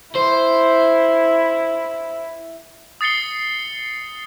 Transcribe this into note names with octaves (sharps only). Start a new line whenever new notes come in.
E4 C5
D#6 A6 C7 C#7 G7